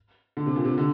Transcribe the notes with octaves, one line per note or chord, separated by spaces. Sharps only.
D3
C3
A#2
C3
D3